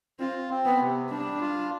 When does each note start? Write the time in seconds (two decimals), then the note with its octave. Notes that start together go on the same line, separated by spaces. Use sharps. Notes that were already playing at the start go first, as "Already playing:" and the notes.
0.19 C4 F4
0.50 C4
0.65 B3
0.80 C3
1.10 G3 D4
1.41 F4